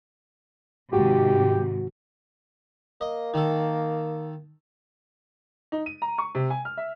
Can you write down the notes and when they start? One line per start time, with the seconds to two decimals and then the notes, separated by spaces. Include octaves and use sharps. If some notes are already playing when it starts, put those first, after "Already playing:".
0.93 G#1 G#2 C3 F#4 G4
3.01 A#3 D#5
3.34 D#3 A4
5.72 D#4
5.86 D#7
6.02 A#5
6.18 C#6
6.35 C3
6.50 G#5
6.65 F6
6.77 E5